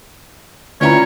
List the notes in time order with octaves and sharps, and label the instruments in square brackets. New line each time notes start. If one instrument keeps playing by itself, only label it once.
[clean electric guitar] D2 [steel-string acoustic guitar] C#4 E4 A#5 [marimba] F4 B4 D5 [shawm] C#5